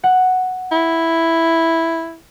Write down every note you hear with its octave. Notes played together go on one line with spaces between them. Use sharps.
F#5
E4